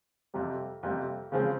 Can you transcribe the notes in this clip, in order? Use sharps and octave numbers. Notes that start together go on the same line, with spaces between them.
F2 C3 G3
F2 C3 G3
C#3 F3 G#3 C4